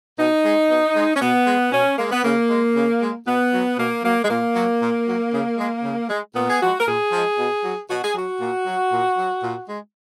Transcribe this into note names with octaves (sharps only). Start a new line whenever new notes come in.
B2 D#4
G#3
B2
G#3
C#4
B2 B3
G#3
B2 C#4
G#3 A#3
B3
C#3 A#3
G#3
C#3
G#3
B2 B3
F#3
B2 A#3
F#3 A#3
G#3
A#2 A#3
F#3
A#2
F#3
C#3
G#3
C#3
G#3
A#2 B3
G#4
F3 G#3 F#4
A#4
A#2 G#4
F3 G#3
B2
F#3
B2 F#4
G#4
F#3 F#4
A#2
F#3
A#2
F#3
A#2
G#3